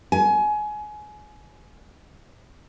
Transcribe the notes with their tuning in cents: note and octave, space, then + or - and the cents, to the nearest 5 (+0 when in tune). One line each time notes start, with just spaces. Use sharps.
G#5 +25